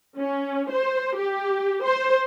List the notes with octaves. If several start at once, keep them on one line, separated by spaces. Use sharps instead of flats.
C#4
C5
G4
C5